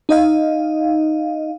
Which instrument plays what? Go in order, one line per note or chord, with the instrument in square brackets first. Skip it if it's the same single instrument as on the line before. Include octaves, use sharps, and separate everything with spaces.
[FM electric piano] D#4 D#5 F5